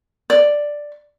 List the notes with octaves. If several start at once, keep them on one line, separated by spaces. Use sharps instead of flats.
D5